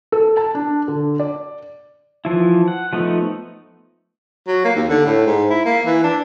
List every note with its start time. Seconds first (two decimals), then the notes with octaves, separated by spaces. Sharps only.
0.12 A4
0.37 A5
0.55 D4
0.88 D3
1.20 D5
2.25 E3 F3 E4
2.68 F#5
2.93 F3 A3 B3 D#4
4.47 F#3
4.65 A#3
4.76 D#2
4.89 D3
5.05 A2
5.26 G#2
5.50 E4
5.65 A#3
5.86 E3
6.04 D4